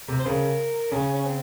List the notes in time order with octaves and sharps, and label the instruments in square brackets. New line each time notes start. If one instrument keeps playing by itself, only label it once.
[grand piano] C3
[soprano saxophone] C5
[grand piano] C#3 [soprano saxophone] A#4
[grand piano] C#3 [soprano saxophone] C#4
[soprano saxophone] C#4
C4